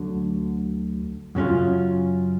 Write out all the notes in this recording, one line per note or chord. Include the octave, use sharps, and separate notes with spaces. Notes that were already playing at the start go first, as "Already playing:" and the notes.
Already playing: D2 D3 F#3
F#2 C#3 F#3 C#4 F4